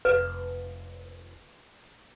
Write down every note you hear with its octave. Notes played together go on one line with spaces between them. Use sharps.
F1 B4